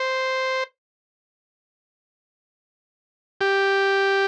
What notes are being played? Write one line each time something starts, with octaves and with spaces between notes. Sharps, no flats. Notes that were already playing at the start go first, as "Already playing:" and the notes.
Already playing: C5
G4